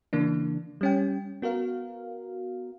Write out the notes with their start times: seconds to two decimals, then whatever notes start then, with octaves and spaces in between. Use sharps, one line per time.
0.13 C#3 E3 A#3 D4
0.81 G3 C#4 G5
1.42 B3 F#4 A#4 F5